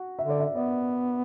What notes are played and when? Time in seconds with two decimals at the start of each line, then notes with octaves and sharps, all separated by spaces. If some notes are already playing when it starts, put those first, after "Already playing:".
Already playing: F#4
0.19 E5
0.24 D3
0.30 D5
0.40 E5
0.55 B3 D5